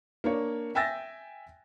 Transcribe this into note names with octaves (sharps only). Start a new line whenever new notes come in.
A#3 D4 C#5
E5 G5 G#5 E6 A6 A#6